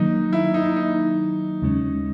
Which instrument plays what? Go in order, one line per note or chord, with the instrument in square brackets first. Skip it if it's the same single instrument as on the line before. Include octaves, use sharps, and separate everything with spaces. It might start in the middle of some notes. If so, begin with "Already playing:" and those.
Already playing: [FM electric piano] D#3 F#3 A#3 [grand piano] D#4
[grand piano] E4
D#4
D#4
[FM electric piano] D#2 C#3 G#3 C#4